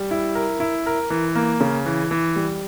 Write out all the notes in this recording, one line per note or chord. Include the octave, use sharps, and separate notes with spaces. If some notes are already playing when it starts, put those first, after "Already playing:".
Already playing: G3
E4
A#4
E4
A#4
E3
A#3
C#3
E3
E3
G3